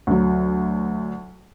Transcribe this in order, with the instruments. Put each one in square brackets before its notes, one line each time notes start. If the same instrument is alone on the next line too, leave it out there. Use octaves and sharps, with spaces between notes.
[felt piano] D2 F#3